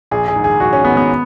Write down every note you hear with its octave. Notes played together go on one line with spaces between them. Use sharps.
A#1 G#4
G#4
G#2 D#3
G#4
A#1 F#4
C#4
G#2 D#3 B3
B3